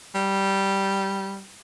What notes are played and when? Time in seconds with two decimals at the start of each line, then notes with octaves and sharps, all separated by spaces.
0.15 G3